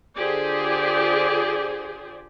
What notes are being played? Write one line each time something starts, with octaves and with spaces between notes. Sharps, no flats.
D3 F4 G4 G#4 C5 D5